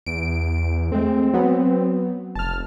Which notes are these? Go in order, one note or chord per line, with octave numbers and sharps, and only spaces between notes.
E2 D7
G#3 A3 C4
F#3 B3
F1 A5 F6